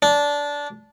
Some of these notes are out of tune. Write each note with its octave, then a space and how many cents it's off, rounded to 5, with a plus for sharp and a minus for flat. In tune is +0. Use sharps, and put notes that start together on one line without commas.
D4 -15